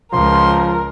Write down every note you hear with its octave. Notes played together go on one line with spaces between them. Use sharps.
C#2 F3 A#4 C6